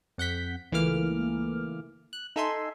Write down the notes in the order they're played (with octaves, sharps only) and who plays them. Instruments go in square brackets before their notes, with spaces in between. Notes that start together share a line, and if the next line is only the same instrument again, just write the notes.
[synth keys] F2 F#5 G6 B6
C#2 E3 A3 A#3 D6 F6
F#6
D#4 A4 E5 G#5 C6